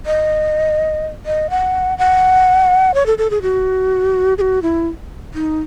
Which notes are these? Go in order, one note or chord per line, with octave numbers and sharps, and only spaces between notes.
D#5
D#5
F#5
F#5
C#5
A4
A4
G#4
F#4
G#4
F#4
E4
D#4